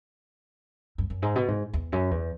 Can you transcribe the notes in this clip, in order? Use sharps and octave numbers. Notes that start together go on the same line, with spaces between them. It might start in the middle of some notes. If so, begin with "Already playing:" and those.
F#2
F#2
G#2
B2
G#2
E2
F#2
E2